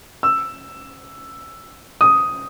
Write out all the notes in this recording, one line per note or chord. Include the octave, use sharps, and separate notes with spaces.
E6
D#6